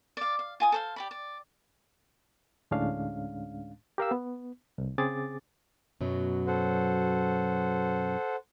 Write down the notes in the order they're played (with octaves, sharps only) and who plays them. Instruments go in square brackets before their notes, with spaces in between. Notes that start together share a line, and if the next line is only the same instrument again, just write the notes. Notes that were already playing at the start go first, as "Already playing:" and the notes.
[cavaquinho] D5 F5
F5
F4 G#5 D#6
A4 C5 F5
G4 D5 B5
D5
[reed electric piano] D2 A2 G#3 C#4 D4 F5
G4 A#4 F5 E6
B3
C2
C#3 C4 G#4 D6 A6
[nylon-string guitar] F#2 B2 F#3
[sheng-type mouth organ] A4 C5 F#5